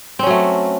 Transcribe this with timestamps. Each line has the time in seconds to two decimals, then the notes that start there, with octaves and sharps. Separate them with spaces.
0.19 C4
0.23 C#4
0.27 F#3
0.30 A3